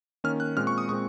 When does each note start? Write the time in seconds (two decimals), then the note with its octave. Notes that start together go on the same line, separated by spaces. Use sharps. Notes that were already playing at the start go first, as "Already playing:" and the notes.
0.24 D#3 A#3 C#4 F6
0.40 F#6
0.57 A#2 G#3 C4 F6
0.67 C#6
0.78 D#6
0.89 A#2 G#3 C4 C#6